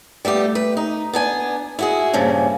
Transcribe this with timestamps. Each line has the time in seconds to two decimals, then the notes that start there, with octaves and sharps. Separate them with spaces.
0.25 G3 A3 B3 G4
0.55 B4
0.77 D#4
1.13 B3 D4 G#5
1.79 E4 F#4 G#4
2.13 G2 A#2 C#3 F3